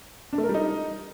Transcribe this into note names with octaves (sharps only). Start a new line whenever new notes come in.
D4
A3
A#4
G3
D#4